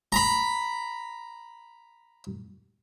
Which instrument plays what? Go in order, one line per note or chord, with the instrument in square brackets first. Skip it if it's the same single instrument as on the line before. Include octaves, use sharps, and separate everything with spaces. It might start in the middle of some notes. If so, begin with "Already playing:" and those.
[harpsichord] A#5 B5